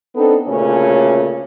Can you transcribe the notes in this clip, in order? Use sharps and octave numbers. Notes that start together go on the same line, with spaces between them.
B3 C4 D4 D#4 A4
D2 A#2 C#3 A3 C#4 C#5